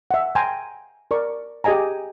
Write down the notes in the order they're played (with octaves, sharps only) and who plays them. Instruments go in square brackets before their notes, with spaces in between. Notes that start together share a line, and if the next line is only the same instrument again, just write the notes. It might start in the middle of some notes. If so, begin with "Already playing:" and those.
[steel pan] E5 F#5
G5 G#5 A#5 C6
A#4 D5 C#6
G4 G#4 D#5 G#5 A#5